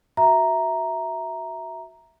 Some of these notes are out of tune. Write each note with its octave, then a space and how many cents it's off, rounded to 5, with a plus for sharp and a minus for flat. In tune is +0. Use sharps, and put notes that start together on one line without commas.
F#4 +0 E5 -5 A#5 +0